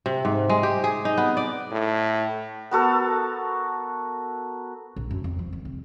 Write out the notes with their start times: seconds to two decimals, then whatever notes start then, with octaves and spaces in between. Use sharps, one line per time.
0.06 C3
0.25 G#2
0.50 G#3
0.63 G4
0.84 G#4
1.05 D#4
1.17 B3
1.37 D5
1.72 A2
2.71 B3 F#4 A4 A#4
4.96 A#1
5.11 F#2
5.24 F2
5.39 F3
5.53 D#3
5.65 F1